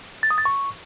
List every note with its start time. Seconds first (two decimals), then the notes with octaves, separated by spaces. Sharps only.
0.23 A6
0.31 D#6
0.38 A6
0.45 C#6